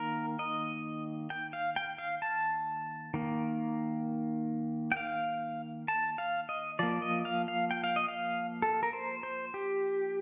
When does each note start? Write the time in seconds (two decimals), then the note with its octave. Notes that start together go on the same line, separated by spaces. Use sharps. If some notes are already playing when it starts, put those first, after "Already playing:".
Already playing: D#3 A#3 A#4
0.39 D#5
1.30 G5
1.53 F5
1.76 G5
1.98 F5
2.22 A5
3.14 D#3 A#3
4.92 G5
4.97 F5
5.88 A5
6.18 F5
6.49 D#5
6.79 F3 A#3 D5
7.02 D#5
7.25 F5
7.48 F5
7.71 G5
7.84 F5
7.96 D#5
8.08 F5
8.62 A4
8.83 A#4
8.93 C5
9.23 C5
9.54 G4